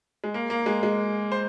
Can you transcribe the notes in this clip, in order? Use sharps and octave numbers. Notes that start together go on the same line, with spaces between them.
G#3
A#3
A#3
G#3
G#3
C5